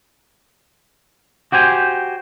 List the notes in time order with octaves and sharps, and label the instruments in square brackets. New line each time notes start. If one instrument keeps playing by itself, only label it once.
[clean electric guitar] F#4 G4 C5 G#5